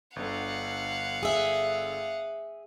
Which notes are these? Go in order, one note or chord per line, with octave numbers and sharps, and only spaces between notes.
G1 D3 F5 F#5
G#4 E5